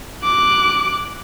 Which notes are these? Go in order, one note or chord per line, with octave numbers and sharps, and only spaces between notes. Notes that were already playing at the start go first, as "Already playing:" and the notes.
D6 F#6